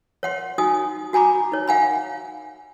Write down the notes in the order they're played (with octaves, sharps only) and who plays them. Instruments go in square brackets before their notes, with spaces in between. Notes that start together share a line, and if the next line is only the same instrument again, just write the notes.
[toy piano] C#5 F#5 C6
D#4 F#4 G#5 D#6
F#4 G#5 A#5 B5 D6
D#4 C#5
F5 F#5 G#5 B5